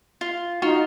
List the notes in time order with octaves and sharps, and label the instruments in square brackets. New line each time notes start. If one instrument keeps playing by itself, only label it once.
[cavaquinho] F4
[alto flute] D#4 [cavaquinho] F4 [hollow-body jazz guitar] F#4